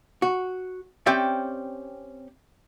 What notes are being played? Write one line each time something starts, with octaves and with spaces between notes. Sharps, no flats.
F#4
C4 C#4 G4 D5 E5